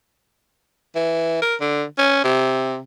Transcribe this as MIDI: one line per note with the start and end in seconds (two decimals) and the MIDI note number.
0.95 1.40 52
1.42 1.55 70
1.60 1.84 50
1.98 2.22 61
2.24 2.79 48